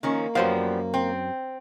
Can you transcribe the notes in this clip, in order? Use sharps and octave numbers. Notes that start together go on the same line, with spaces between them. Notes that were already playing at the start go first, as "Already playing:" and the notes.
D#3 F3 A#3 C#4
F#2 F3 G3 B3 C5 F5
C4